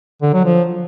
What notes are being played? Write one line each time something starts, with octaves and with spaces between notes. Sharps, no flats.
D3
F#3
F3